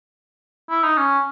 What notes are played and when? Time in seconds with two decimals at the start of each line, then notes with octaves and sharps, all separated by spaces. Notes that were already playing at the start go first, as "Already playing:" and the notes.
0.70 E4
0.84 D#4
0.97 C#4